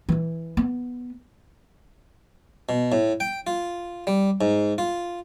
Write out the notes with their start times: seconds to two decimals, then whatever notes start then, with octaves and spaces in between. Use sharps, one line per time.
0.09 E3 E4
0.57 B3
2.69 B2
2.92 A2
3.20 G5
3.47 F4
4.07 G3
4.41 G#2
4.78 F4